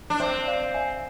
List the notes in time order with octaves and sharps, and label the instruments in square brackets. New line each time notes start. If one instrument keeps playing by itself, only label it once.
[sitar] D4
[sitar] C4 [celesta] C5 E5
[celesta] D5 F5
E5 G#5